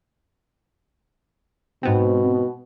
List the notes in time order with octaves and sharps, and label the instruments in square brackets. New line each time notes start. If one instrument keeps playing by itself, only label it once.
[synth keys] G#2 B3 C4 [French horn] B2